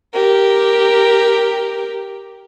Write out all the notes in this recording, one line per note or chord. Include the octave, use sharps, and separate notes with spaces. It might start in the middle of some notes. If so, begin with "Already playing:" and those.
G4 A#4